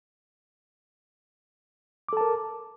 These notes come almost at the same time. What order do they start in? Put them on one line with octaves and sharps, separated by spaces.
D6 A4 A5 A#4